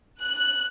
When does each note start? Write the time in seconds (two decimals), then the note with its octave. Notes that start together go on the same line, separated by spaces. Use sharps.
0.22 F#6